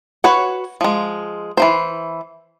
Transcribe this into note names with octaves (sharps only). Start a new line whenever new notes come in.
F#4 B4 C#5 F#5
F3 G#3
E3 F3 C5